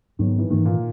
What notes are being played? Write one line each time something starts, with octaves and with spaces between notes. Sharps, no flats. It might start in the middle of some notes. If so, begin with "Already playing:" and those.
G#2 D#3 F#3 B3
E3
G#2 D#3 E3 A#3
A#2